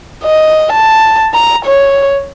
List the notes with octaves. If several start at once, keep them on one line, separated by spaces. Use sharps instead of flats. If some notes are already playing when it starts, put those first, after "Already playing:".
D#5
A5
A#5
C#5